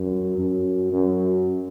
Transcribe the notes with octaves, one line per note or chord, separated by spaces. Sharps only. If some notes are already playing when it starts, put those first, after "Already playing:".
Already playing: F#2
F#2
F#2